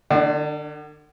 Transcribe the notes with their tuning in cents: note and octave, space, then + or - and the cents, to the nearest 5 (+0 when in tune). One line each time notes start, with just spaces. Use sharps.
D3 +45 D4 +0